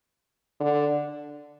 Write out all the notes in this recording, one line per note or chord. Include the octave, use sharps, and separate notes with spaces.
D3